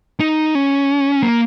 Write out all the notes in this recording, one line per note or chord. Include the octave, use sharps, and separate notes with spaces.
D#4
C#4
A#3